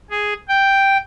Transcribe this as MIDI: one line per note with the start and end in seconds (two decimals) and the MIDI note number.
0.10 0.34 68
0.49 0.97 79